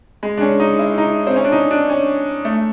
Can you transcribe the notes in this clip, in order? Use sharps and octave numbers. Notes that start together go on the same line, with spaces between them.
G#3
D4
C#4
D#4
E4
D#4
C4
C#4
D4
D#4
D4
C#4
A3